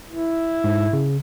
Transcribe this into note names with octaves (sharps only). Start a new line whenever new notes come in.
E4
G#2
C#3